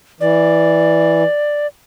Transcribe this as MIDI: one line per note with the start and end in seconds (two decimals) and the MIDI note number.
0.21 1.23 52
0.21 1.67 74